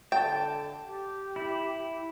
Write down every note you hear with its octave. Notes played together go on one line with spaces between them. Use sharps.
D3 G5 A5
G4
E4